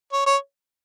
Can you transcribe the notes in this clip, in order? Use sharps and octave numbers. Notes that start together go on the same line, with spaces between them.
C#5
C#5